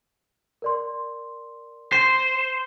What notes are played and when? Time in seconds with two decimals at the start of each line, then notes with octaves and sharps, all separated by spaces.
0.62 A#4 D5 C6
1.92 C5